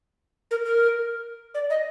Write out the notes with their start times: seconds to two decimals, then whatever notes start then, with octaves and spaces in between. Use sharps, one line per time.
0.51 A#4
0.65 A#4
1.55 D5
1.70 D#5